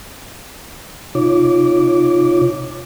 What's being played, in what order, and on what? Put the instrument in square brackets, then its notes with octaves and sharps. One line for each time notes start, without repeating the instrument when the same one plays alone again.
[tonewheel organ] C3 D#4 F4 C#5 D6